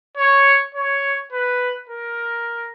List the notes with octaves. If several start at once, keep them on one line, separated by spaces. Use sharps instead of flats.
C#5
C#5
B4
A#4